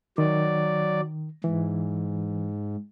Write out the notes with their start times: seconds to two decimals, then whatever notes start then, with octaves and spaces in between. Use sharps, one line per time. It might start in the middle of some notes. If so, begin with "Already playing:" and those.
0.18 D#3 F#3 D5
1.44 G#2 E3